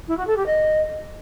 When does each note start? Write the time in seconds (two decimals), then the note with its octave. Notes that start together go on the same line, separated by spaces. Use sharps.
0.08 E4
0.17 F#4
0.27 A4
0.36 G4
0.46 D#5